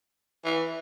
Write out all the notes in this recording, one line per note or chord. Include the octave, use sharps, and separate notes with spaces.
E3